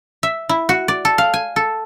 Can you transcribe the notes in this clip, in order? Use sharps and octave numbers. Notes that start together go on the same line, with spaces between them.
E5
E4
F#4
D5
A4
F5
G#5
A4